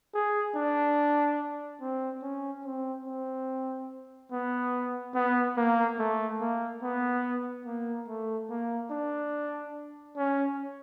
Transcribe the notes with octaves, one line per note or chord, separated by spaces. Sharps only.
G#4
D4
C4
C#4
C4
C4
B3
B3
A#3
A3
A#3
B3
A#3
A3
A#3
D4
C#4